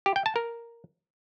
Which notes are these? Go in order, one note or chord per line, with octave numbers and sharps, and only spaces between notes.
G4
G5
A5
A#4